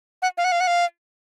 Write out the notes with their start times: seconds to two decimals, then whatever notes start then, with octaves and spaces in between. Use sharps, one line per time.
0.22 F#5
0.37 F5
0.45 F#5
0.52 F5
0.60 F#5
0.67 F5